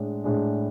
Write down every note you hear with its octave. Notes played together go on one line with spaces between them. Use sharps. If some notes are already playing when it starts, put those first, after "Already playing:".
Already playing: A2 G#3 D4
A2 G#3 D4